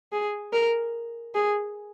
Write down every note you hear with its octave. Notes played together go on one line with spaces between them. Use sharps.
G#4
A#4
G#4